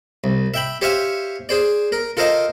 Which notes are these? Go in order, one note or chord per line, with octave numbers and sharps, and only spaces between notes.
C2
E5 G5 B5
G4 C5 C#5 E5 F5 G#5
G#4 C5 D5
A#4
F4 A4 A#4 C5 D#5 F5